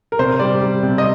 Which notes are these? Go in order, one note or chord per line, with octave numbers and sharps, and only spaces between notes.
A#4
C3 C5
G3 D5
G3
C3
D#5